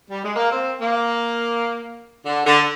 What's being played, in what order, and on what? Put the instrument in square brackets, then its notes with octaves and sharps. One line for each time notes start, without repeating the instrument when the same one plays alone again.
[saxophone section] G3
G#3
A#3
C4
A#3
D3
D3